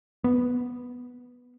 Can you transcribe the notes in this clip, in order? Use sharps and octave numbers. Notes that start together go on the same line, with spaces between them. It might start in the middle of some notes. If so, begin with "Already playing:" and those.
B3